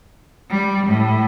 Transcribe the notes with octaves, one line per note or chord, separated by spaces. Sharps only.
G3
A2